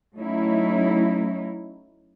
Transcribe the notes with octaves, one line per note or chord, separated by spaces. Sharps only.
F#3 A3 C#4 D#4 E4